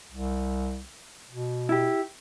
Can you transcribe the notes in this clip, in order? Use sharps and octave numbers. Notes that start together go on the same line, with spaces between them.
C2
B2
E4 G4